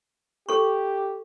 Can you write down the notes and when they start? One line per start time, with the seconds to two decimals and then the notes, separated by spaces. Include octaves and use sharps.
0.49 G4 A4 C#6